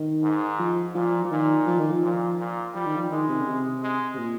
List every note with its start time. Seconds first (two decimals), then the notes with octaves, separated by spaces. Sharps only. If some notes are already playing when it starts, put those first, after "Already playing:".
Already playing: D#3
0.23 G#2
0.59 F3
0.95 A#2 F3
1.24 F3
1.31 A#2 D#3
1.67 F3
1.79 D#3
1.91 F3
2.03 A#2
2.39 A#2
2.75 F3 G3
2.86 D#3
2.96 F3
3.11 D#3 G#3
3.28 C3
3.40 C#3
3.47 C3
3.83 G#3
4.15 C3
4.18 A#2